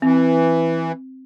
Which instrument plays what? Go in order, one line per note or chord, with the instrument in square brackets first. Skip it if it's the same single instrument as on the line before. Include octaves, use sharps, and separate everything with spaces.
[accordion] E3 [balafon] C4